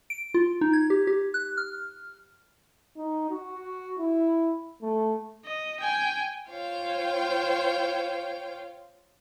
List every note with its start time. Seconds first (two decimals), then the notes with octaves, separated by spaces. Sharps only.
0.10 D7
0.34 F4
0.61 D#4
0.73 G#6
0.90 G4
1.07 G4
1.34 F#6
1.57 F6
2.97 D#4
3.31 F#4
3.99 E4
4.82 A3
5.46 D#5
5.80 G5 G#5
6.49 F4 C5 C#5 F5 G5